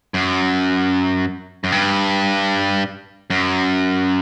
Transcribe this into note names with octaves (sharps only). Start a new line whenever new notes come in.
F#2
F#2
G2
F#2